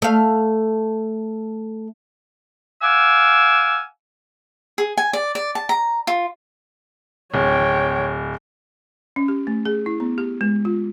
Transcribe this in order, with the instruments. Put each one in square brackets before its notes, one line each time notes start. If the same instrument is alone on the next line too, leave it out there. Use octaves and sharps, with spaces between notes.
[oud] A3 F5
[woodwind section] F5 F#5 G#5 D6 E6
[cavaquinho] G#4
G#5
D5
D5
A5
A#5
F4
[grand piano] D1 [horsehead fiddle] C#5 G5
[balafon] C#4
G4
A3
G#4
E4
B3
G4
G#3
F4